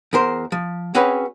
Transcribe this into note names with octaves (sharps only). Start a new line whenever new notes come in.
E2 A#4 C5
F3
C4 C#4 F#4 G#4 B4 C#5